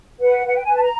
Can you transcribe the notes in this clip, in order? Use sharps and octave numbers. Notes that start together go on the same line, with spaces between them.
B4 F#5
B4 F#5
G5
B4 G#5
A5
A#5